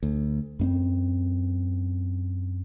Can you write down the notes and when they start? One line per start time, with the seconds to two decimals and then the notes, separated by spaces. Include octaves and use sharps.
0.03 D2
0.59 F#2 B3 C4